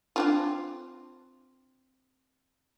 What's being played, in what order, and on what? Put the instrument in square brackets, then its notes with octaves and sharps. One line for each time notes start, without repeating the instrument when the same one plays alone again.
[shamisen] C4 D4 F4